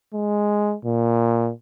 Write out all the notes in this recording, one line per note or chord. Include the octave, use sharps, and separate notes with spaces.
G#3
A#2